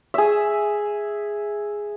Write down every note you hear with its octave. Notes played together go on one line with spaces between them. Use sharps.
G#4 E5